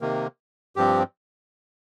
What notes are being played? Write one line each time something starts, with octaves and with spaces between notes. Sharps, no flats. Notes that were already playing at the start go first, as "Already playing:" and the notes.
C3 D#3 A#3
G2 F3 C4 G4